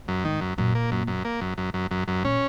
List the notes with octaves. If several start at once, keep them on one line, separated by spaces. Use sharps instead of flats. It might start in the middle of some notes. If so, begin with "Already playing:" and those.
F#2
G#2 D#3
F#2
F#2 A#2
A#3
F#2
F#2
A#3
F#2
F#2
F#2
F#2
F#2
A#2 C#4